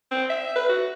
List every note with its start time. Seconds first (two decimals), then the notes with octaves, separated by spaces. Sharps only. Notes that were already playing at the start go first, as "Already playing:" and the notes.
0.11 C4
0.30 E5
0.56 B4
0.69 F#4